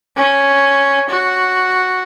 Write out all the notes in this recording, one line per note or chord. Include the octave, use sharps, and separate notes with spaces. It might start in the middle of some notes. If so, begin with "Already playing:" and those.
C#4
F#4